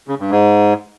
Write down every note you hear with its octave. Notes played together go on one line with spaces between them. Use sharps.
C#3
G2
G#2